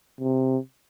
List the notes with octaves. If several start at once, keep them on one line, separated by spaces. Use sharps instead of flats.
C3